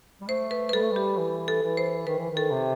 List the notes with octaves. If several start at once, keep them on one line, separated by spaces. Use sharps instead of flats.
G3
A3 C5
B4
B4
G3 A4
A3
G3 G4
E3
A4
E3
C5
D#3 B4
E3
D#3
A4
C3